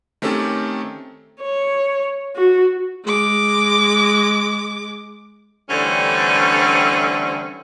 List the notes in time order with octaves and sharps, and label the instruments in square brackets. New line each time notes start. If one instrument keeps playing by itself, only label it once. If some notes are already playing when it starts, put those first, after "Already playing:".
[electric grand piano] D#3 A3 C4 C#4 G4 A4
[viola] C#5
F#4
G#3 D6
[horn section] D3 E3 G3 A3 C4 C#4